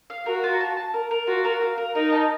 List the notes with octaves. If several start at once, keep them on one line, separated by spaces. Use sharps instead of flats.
F5
F#4 A#4
F4
A5
A5
A#4
A#4
F4 F#4
A#4
F5
A#4
D#4 A#4
A5